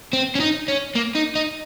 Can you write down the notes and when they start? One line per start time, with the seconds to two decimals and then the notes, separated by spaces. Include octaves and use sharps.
0.13 C4
0.35 C#4
0.40 D#4
0.68 C#4
0.95 A#3
1.15 D#4
1.35 D#4